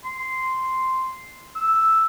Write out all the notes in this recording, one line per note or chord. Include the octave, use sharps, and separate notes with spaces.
C6
E6